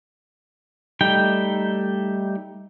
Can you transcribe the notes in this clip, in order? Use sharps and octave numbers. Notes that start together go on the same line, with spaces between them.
G3 A3 D#4 G5